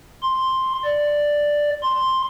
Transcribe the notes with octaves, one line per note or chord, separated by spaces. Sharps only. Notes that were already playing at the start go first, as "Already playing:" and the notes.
C6
D5
C6